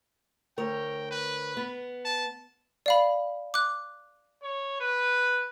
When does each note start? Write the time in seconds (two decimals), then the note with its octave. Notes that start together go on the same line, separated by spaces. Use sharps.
0.58 D2 A#4 C#5 G5
1.11 B4
1.57 B3
2.05 A5
2.86 D5 F5 B5
3.54 D6 F#6
4.42 C#5
4.80 B4